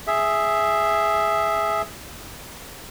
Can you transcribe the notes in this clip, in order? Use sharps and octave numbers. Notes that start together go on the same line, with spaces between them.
G#4 E5